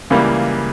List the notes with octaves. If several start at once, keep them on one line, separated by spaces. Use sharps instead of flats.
C#2 C#3 E3 G3 A#3